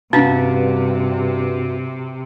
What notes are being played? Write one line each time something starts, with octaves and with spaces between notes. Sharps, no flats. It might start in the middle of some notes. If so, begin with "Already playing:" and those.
G2 C3 B3 C#4 D4 F#4 F5